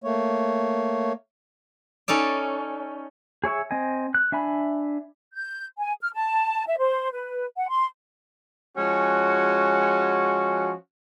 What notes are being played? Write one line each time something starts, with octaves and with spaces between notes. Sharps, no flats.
A3 A#3 C#5
C#4 D#4 A4 D5
G#4 C#5 E5 C#6
C4 D#5 G#5
F#6
D4 E5 G#5 B5
G6
G#5
F6
A5
E5
C5
B4
F#5
C6
F3 G#3 C#4 F#4